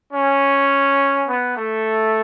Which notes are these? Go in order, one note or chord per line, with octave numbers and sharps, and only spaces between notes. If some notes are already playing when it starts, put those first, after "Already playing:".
C#4
B3
A3